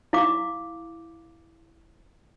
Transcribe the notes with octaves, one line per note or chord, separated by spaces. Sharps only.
E4 F5 D6